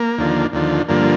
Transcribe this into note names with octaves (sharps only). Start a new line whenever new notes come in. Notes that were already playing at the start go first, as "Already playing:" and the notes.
Already playing: A#3
D#2 D3 F3
D#2 D3 F3
G2 D3 F3 A#3